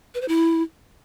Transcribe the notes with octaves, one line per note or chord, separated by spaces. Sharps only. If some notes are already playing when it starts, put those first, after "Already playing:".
B4
C5
E4